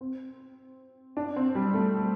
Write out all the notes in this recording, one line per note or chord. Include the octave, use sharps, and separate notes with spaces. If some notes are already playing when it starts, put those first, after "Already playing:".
C4
D4
C4
G3
A3